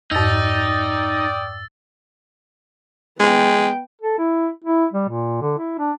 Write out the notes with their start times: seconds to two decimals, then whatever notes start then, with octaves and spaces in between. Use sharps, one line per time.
0.11 F2 G#2 D#4 D5 G5 D#6 E6 A6
3.20 G#3 B3 G5
4.02 A4
4.19 E4
4.65 E4
4.94 G3
5.10 A#2
5.41 D3
5.58 E4
5.79 D4